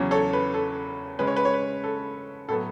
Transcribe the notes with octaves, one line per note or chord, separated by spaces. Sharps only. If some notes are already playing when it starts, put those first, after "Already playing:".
Already playing: E2 C#3 F#3 C#4
A4 C#5
B4
A4
C#3 G#3 C#4 B4
C#5
B4
C#5
B4
A4
A2 F#3 B3 A4